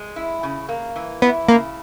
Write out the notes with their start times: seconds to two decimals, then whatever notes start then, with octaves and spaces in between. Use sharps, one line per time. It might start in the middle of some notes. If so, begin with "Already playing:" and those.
Already playing: G#3
0.16 E4
0.43 C#3
0.69 A#3
0.96 E3
1.22 B3 E4
1.48 C#3 A#3